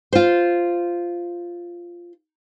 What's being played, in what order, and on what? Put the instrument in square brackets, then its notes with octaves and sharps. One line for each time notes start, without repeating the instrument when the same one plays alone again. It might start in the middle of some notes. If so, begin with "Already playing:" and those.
[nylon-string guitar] F4 C5